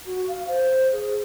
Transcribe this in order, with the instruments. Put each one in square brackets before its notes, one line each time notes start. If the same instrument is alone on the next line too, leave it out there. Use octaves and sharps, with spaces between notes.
[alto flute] F#4
F5
C5
G#4